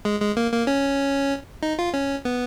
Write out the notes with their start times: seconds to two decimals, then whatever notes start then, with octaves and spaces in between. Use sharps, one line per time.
0.05 G#3
0.21 G#3
0.37 A#3
0.52 A#3
0.67 C#4
1.63 D#4
1.79 F4
1.94 C#4
2.25 B3